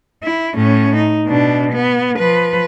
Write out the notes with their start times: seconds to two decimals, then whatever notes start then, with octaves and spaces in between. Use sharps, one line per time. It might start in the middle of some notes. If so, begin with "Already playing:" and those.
0.23 E4
0.55 A2 C#4
0.96 D#4
1.26 B2 D4
1.73 B3
2.17 F3 B4